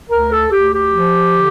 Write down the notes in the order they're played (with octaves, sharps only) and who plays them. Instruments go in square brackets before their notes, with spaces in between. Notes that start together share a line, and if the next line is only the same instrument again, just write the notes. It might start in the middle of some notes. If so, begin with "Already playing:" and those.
[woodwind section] D2 A#4
A4
D2 G4
G4
F3
D3